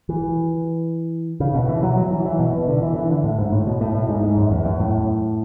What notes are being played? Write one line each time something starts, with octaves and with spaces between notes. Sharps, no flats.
E3
C#3
B2
E3
F#3
F#3
E3
E3
B2
B2
D3
E3
E3
D3
A2
G#2
A2
B2
A2
A2
G#2
G#2
F#2
E2
F#2
A2